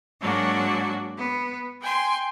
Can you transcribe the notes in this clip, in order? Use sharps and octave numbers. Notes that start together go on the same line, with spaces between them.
G#2 F#3 G#3 A#3 D4 F#4
B3
G5 G#5 C6